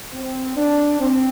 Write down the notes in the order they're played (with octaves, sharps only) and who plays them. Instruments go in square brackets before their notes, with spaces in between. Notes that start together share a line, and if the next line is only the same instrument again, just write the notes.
[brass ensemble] C4
D4
C4